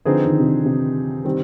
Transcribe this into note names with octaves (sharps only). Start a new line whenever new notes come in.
D3 F3 C4 D#4 G#4 B4
D#3
C3
D3
C3
D#3 G3 C4